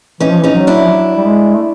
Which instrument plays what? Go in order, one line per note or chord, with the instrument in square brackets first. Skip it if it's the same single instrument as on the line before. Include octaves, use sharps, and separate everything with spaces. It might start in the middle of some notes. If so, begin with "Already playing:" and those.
[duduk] E3 [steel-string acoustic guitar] C#4 D#4
[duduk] F3
[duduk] E3 [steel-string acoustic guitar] C#4 D#4
[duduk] F#3
[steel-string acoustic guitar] D4 E4
[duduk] F3
F#3
G3
G#3
A3